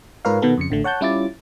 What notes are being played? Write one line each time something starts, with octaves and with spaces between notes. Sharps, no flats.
G#2 F4 A#4 B4 C#5 F5
B2 D#3 B3 A4
F2 C#3 C#7
A1 D3 A3
C#5 F#5 A5 G6
G3 C#4 E4 F4 D6 A6